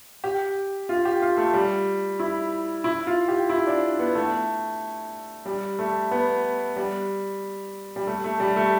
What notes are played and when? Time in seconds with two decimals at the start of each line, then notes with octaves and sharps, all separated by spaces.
0.24 G4
0.89 F4
1.05 G4
1.22 F4
1.37 A3
1.54 G3
2.19 E4
2.84 E4
3.07 F4
3.28 G4
3.50 E4
3.67 D4
3.99 B3
4.15 A3
5.46 G3
5.79 A3
6.11 B3
6.76 G3
7.96 G3
8.07 A3
8.24 A3
8.40 G3
8.56 A3